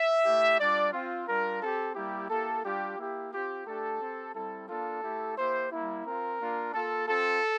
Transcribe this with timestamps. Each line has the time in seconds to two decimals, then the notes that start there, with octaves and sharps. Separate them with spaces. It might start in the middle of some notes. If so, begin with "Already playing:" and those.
Already playing: E5
0.25 A3 E4 G4
0.59 G3 D4 F4 D5
0.93 C4 F4
1.27 G3 D4 F4 A#4
1.61 C4 G4 A4
1.95 G3 A#3 E4 G4
2.30 A#3 E4 G4 A4
2.64 G3 D4 F4 G4
2.98 A#3 E4 G4
3.32 C4 F4 G4
3.66 A3 D4 G4 A4
4.00 C4 G4
4.34 G3 C4 E4 A4
4.68 A#3 D4 F4 A4
5.03 A3 E4 G4
5.36 A#3 E4 G4 C5
5.71 G3 A#3 E4
6.05 C4 F4 A#4
6.39 A#3 D4 F4
6.73 A#3 F4 A4
7.07 C4 F4 A4